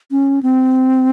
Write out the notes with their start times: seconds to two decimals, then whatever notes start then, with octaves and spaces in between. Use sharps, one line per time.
0.11 C#4
0.43 C4